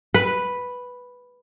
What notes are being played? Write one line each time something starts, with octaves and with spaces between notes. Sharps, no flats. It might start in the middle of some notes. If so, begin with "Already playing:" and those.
B4